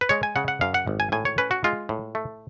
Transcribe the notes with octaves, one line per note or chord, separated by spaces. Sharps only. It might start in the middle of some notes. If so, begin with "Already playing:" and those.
B4
G#3 C#5
G#5
C#3 F#5
F#5
F#2 F5
F#5
G#1
G#5
A2 G#5
C#5
C#4 B4
F#4
G#3 F4
A2
A3